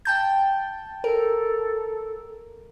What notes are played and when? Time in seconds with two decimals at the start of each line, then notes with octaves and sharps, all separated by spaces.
0.05 G5 A5 G6
1.04 A4 A#4